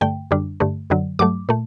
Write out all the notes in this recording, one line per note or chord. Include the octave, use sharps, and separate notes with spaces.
G2 D3 A3 G5
F#2 D3 G3 D4
G2 D3 A3
F#2 D3 F#3
G2 F#3 A3 D6
A#2 A3